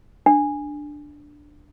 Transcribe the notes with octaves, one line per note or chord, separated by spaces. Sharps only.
D4